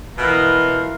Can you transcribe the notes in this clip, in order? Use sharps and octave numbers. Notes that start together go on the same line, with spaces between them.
B2 E3 E4 F4 A#4 F5